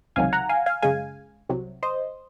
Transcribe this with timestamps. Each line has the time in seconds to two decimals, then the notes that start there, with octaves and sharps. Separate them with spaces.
0.16 C#2 C3 D#3 F#3 F5 G#5
0.33 F#5 A#5
0.49 F5 G#5
0.66 F5 G#5
0.82 F#2 C#3 G#3 F5 G#5
1.49 C2 C3 F#3
1.83 C5 D#5